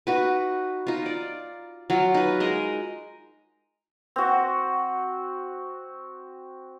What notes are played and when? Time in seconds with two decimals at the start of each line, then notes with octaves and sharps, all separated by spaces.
0.07 D#4 F#4 B4
0.87 D#4 F4
1.06 D5
1.90 F#3 F4
2.14 D#4 B4
2.40 G#3 A#4 D#5
4.16 C4 F#4